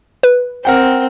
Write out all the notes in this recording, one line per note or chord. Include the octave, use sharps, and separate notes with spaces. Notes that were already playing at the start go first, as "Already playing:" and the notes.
B4
C4 A#4 F#5 G5